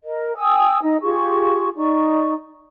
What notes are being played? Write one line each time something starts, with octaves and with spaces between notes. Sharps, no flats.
A#4 D#5
G5 G#5 D#6 E6
D#4 D#5
F4 G4 G#4 C#6
D#4 D5 C#6